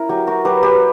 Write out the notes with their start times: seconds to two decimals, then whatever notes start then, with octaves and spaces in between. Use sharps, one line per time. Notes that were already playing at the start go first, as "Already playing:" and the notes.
Already playing: C#4 E4 A#4
0.09 F#3 G4
0.27 F#4 A#4
0.45 F#3 G4 B4
0.63 G4 B4